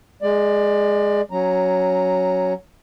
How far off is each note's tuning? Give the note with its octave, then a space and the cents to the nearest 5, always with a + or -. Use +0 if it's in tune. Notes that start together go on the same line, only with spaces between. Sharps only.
G#3 +0 D5 +25
F#3 +0 C#4 +0 A#5 +0